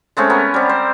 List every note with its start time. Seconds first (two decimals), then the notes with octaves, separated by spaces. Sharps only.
0.17 G#3 A3 C4 C#4
0.30 B3 A#4
0.54 G3 C4
0.69 C5